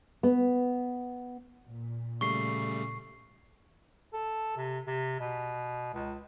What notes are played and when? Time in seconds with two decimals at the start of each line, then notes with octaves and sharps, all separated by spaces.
0.23 B3
1.67 A#2
2.21 C#3 G3 A3 C#6 C7
4.13 A4
4.57 C3
4.86 C3
5.20 B2
5.94 C#2